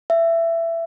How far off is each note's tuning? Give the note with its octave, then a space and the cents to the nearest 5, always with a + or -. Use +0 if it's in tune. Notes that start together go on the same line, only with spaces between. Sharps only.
E5 +20